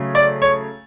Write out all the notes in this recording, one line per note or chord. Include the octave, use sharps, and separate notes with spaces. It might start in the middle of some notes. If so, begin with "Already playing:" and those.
Already playing: C#3 F#3 A3
D5
C#5